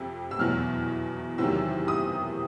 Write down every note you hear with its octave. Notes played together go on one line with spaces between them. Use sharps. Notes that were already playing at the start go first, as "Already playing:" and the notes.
Already playing: F2 C3
E6
E2 B2 F#3 F6
E2 C3 D#3 F#3 E6
D#6